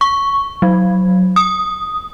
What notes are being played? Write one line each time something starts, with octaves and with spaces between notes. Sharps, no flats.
C#6
F#3
D#6